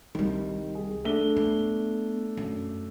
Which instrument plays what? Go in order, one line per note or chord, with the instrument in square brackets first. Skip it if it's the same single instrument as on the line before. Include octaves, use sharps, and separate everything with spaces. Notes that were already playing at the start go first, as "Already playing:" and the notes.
[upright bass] C2 G3 [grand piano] D#3
[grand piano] G#4
A3 D4 G7
[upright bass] B3
F#2